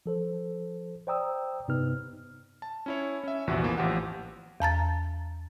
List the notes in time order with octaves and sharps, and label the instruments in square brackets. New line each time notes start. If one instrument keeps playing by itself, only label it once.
[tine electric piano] F3 A4 C5
C5 D5 G5 A#5 D#6 E6
G2 C3 B3 D#4 B4 F6
[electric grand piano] A5
C#4 E4 C#5
C#4 E5
A#1 E2 C3 E4 F#4
E3 F3 A#3 B3
A1 F3 G4 F#5
[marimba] E2 A5 A#5 A6